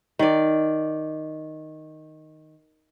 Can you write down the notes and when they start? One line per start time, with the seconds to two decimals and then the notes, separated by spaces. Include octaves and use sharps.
0.19 D#3 D5